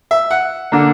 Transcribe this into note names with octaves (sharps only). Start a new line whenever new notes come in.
E5
F#5
D3 A#3 D4